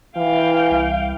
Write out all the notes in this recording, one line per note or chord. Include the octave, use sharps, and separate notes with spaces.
E3 F5 G5
C2